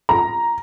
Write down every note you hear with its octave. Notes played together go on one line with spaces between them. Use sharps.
A#5